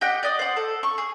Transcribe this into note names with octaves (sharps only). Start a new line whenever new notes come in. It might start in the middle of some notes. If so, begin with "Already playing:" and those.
G4 D#5 F#5 G5
D5 D#5
C5 F#5
A4
C#6
G#4